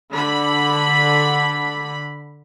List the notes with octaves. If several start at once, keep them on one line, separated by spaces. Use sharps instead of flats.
D3 B5